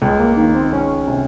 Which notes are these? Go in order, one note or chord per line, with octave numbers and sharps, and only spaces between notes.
C#2 G#3
A#3
D#3 A#3
C4
C#2 C#4
C3